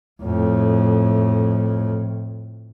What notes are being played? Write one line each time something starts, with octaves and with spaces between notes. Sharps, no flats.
F2 A2